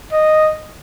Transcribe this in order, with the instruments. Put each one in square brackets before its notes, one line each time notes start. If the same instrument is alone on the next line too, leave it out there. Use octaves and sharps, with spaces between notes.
[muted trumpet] D#5